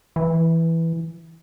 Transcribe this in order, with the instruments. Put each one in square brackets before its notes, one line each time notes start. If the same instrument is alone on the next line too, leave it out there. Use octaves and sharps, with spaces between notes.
[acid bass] E3